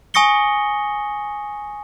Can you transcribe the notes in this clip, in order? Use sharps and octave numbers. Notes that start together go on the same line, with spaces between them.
G#5 C#6 D#6 A#6 C#7 G7